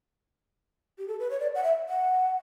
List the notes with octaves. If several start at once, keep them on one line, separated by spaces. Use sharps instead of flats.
G4
A4
B4
C#5
D5
F#5
E5
F#5